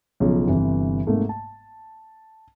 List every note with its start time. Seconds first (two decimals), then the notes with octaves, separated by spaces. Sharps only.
0.20 B1 C#3 F3
0.47 G1 C3 E3
1.07 G#2 C3 A3 A#3
1.29 A5